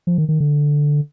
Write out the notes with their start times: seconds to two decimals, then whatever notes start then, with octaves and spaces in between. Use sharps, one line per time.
0.07 F3
0.18 D#3
0.29 D#3
0.40 D3